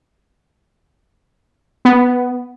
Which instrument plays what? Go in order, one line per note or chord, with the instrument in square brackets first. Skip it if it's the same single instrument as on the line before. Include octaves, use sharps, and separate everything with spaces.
[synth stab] B3